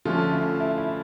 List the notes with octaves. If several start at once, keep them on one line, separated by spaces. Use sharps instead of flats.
D3 F3 A3 C#4 F4
E4
E4
E4